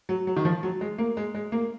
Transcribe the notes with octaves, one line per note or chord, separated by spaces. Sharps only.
F#3
F#3
D#3
F3
F#3
G#3
A#3
G#3
G#3
A#3